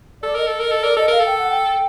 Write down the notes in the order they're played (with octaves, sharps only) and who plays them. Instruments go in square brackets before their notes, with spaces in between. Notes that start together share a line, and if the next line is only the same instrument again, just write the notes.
[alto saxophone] A4 [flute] D5
[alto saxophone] A#4 [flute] D#5
[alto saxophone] A4
A#4
[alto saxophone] A4 [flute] D#5
[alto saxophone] A#4 [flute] D5
[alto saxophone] A4 [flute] D#5
[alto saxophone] A#4 [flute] F5
[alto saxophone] A4
[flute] G5
F#5
G5